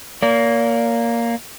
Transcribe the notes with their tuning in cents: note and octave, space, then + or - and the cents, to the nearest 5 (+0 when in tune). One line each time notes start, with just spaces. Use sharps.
A#3 +0 D5 -40